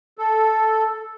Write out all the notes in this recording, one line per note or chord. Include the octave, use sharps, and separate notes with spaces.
A4